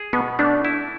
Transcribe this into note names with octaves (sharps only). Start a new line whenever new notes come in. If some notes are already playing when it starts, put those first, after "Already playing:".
Already playing: G#4
B2 B3
A3 D4
E4